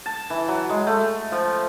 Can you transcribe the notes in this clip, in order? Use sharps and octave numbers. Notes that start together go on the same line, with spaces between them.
A5
E3
F#3
G#3
A3
F3